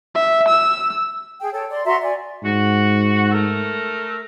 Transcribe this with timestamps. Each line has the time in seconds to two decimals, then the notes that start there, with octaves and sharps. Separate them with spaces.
0.15 E5
0.48 E6
1.40 G#4 G5
1.53 A4 C#5 G5
1.70 D5 C6
1.85 F#4 E5 A#5 C6
2.02 D5 G#5
2.43 G#2 F#4
3.32 A3 A4 A#4